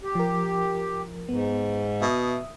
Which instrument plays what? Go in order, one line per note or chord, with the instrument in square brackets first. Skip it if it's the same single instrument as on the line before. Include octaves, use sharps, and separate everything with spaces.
[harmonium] G4
[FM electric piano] F3 A#4
[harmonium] G#2 [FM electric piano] B3
[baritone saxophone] B2 [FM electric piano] E5 D#6